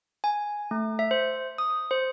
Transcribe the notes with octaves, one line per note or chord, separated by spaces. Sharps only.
G#5
A3
E5
C5
D#6
C5